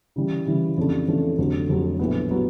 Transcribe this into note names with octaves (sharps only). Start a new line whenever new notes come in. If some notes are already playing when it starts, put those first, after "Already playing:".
C#3 E3 G3
C#3 E3 G3
F2 C#3 E3 A3 D4
F2 C#3 E3 A3 D4
F1 F2 D3 F#3
F1 F2 D3 F#3
A#1 A2 F#3 B3
A2 F#3 B3